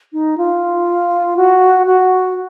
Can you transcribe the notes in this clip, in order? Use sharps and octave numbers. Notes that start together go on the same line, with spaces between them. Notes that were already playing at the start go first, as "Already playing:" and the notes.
D#4
F4
F#4
F#4